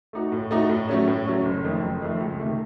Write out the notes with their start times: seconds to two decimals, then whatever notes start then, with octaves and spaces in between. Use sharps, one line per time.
0.13 A3 D#4 F#4
0.32 A2
0.51 A3 D#4 F#4
0.69 A2
0.89 F#3 A3 C#4
1.08 A2
1.27 F#3 A3 C#4
1.45 F#1
1.64 F2 D#3 A3
1.83 F#1
2.02 F2 D#3 A3
2.20 C#2
2.40 C3 D#3 A3